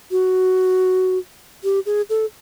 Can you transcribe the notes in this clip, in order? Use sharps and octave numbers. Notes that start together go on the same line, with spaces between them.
F#4
G4
G#4
A4